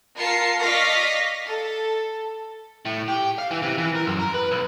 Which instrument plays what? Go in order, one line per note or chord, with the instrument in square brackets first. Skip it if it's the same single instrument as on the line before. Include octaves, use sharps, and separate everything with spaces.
[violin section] F4 A#4 A5 C7 C#7
D5 D#5 F5 C#6 A#6 B6
A4
[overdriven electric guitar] A2
G4
F5
E3
C3
E3
A#4
F#2
A#4
B4
B1